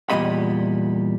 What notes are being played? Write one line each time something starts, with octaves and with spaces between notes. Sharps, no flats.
E2 G2 A#2 G3 D#5 B5